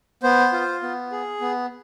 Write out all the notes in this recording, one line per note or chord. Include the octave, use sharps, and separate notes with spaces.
B3 C5
F4
B3
G#4
B3